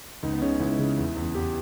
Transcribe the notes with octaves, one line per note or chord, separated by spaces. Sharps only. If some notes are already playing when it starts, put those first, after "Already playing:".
C#2 D#4
B3
C#3 C#4
C#2 E4
C#3
E2
E2
E2 G4